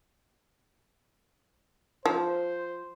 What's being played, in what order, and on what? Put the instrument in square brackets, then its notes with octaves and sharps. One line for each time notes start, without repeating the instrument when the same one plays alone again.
[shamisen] F3 [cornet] C5